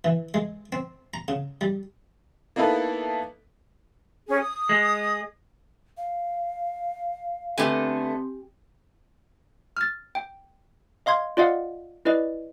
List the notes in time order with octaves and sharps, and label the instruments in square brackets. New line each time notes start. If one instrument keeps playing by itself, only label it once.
[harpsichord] E3
G#3
C4
A#5
C#3
G3
[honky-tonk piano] A#3 B3 D#4 E4 A4 B4
[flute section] C#4 G#4
D#6
[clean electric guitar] G#3
[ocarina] F5
[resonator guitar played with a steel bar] D3 A3 B3 [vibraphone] C4 [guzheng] G4 G#5
[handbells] F6 A6
G5
D#5 F5 C6 G#6
F4 D5 D#5 F5 F#5
E4 B4 D5 D#5